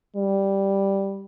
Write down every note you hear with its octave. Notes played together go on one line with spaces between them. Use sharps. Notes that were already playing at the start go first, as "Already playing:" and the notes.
G3